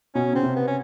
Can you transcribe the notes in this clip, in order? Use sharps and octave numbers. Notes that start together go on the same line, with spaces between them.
B2 C#4
C#3 C4
C3
B3
C#4